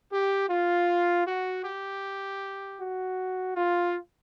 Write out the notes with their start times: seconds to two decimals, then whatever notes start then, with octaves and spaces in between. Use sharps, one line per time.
0.12 G4
0.49 F4
1.26 F#4
1.64 G4
2.79 F#4
3.55 F4